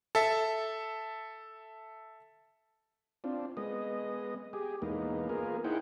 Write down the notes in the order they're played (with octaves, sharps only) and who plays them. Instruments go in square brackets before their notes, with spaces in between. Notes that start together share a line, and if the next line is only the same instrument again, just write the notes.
[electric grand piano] A4 E5
[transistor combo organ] C4 D4 F4
G#3 B3 D#5
G4 G#4
E2 G#3 A#3 B3 D#4
A#3 B3 F4 G#4 A#4
D#4 E4 G#4 C5 F#5 G5